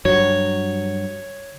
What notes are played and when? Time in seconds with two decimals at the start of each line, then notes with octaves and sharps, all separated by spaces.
0.05 G2 F#3 C#5